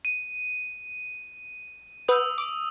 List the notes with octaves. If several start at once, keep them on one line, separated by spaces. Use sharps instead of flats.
D#7
B4 F#5 D#6 E6 G6
D6